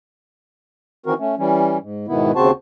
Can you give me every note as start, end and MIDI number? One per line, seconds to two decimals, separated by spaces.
1.06 1.14 51
1.06 1.14 52
1.06 1.14 60
1.06 1.14 66
1.06 1.14 70
1.19 1.35 57
1.19 1.35 61
1.38 1.78 52
1.38 1.78 55
1.38 1.78 61
1.80 2.07 44
2.08 2.32 44
2.08 2.32 47
2.08 2.32 51
2.08 2.32 59
2.08 2.32 64
2.35 2.51 39
2.35 2.51 49
2.35 2.51 60
2.35 2.51 66
2.35 2.51 72
2.35 2.51 81